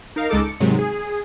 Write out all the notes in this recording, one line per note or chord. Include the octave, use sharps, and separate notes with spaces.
D#4 A#4 F5
C#2 G#3 D#4 A4 D6
C#7
G#2 C3 D#3 F#3 G#3
G#4